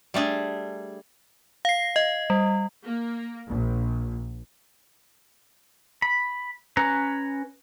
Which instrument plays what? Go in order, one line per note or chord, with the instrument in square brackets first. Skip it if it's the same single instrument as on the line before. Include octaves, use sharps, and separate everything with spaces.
[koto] G3 A3 D4 G#4
[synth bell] F5 C7
D#5
G3
[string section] A#3
A#1
[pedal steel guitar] B5
C#4 B4 A#5